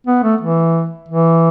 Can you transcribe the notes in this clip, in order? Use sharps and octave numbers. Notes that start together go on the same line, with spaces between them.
B3
A3
E3
E3